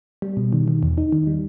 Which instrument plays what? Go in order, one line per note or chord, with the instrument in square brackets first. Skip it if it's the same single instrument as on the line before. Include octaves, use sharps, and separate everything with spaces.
[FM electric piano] G3
B2
D#3
D#3
E2
D#4
D#3
G3